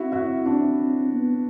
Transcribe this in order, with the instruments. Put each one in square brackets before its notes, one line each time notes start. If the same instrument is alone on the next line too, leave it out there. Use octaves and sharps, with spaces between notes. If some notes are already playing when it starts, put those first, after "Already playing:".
Already playing: [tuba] C4 [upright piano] E4 F#4
[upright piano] E4 F#4
D4 E4
[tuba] B3